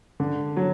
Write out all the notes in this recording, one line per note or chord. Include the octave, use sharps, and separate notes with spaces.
D3
F#3